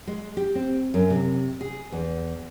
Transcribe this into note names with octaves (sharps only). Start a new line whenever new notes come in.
G#3
G4
C4
F#2
C3
G#4
E2